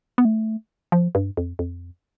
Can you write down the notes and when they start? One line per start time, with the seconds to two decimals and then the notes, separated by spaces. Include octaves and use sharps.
0.18 B3
0.25 A3
0.92 F3
1.15 G2
1.37 F2
1.59 F2